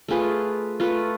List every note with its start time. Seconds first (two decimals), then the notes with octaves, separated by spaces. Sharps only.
0.08 A3 F4 G#4 B4
0.80 A3 F4 B4